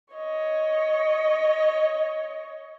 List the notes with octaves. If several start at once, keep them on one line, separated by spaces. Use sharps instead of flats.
C#5 D#5